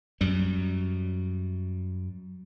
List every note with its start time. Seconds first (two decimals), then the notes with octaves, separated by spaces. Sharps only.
0.21 F#2 G3